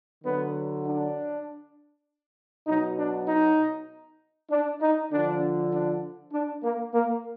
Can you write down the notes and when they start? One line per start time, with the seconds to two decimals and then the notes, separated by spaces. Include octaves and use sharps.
0.24 D3 F#3 B3
0.85 D4
2.67 B2 F#3 D#4
2.99 D4
3.28 D#4
4.51 D4
4.82 D#4
5.11 D3 F3 D4
5.72 D4
6.33 D4
6.63 A#3
6.94 A#3